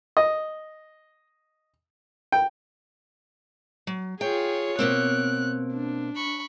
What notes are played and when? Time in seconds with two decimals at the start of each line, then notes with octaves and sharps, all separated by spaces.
0.17 D#5
2.32 G5
3.87 F#3
4.21 F4 G#4 C#5 G5
4.79 B2 A#3 C4 F#6
5.73 D4
6.15 B5 C#6